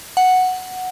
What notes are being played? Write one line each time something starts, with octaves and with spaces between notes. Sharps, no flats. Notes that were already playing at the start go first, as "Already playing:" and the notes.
F#5